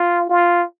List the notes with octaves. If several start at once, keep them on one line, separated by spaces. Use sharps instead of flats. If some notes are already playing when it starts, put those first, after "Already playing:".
Already playing: F4
F4